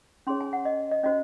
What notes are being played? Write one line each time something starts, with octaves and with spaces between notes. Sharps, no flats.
C#4 G#4 C#5 C6
G#5
F#5
D#5
D#5
C#4 F#4 C5 D#5